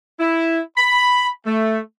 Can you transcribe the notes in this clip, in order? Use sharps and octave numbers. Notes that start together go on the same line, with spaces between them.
E4
B5
A3